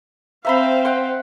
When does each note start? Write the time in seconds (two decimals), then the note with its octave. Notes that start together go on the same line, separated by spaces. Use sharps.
0.45 C4 C5 E5 F5 A#5 B5
0.85 F#5 G5 C6